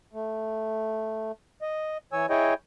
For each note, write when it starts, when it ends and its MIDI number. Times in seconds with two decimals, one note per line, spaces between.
0.13 1.32 57
1.62 1.97 75
2.13 2.26 52
2.13 2.26 73
2.13 2.26 80
2.13 2.26 88
2.30 2.54 64
2.30 2.54 68
2.30 2.54 73
2.30 2.54 75
2.30 2.54 79